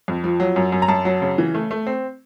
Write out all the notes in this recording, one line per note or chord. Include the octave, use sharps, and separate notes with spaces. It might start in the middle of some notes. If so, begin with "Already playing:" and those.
F2
F3
F#3
F#2
F#2
A#5
F#2 A5
F#3
C#3
E3
A3
A3
C4